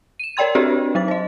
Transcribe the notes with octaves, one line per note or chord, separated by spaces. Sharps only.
D#7 E7
A#4 C#5 D5 G5 C6 G#6
C4 D4 F#4 G4 C#5 D5
F#3 D#4 A6
C5 D#5